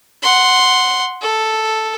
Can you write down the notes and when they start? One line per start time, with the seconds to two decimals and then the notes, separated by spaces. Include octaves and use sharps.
0.22 F#5 C6
1.22 A4